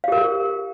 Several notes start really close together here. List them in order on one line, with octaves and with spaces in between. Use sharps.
F5 G4 A#4